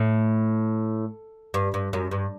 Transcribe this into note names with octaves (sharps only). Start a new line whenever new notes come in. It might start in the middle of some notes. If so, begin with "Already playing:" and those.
Already playing: A2
G2
G2
F#2
G2